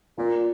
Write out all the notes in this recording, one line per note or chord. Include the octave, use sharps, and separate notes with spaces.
A#2 F4